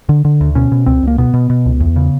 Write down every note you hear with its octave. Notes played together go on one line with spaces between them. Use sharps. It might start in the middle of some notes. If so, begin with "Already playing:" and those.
D3
D3
D2
B2 C#4
B2
C#2 C4
C#2 A#3
B2 B3
B2
B2
C#2
E2
C#3